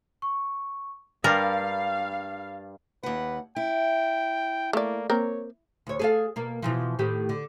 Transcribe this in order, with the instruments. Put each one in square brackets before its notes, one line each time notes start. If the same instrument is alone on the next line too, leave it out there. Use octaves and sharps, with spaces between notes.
[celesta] C#6
[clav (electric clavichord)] G2 G3 [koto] A#4 [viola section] F5 [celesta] A6
[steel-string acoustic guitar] D#2 F#5 [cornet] B4
[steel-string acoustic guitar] E4 [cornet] G5
[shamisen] A3 D5 [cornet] A#3
[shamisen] A#3 C4 A#4 [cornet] C#5
[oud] D2 C#5
G#4 A4 F5
B2 A#3
B2 E3 F3
A2 D#3 G4
D3